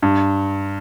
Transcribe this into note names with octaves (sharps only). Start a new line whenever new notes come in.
G2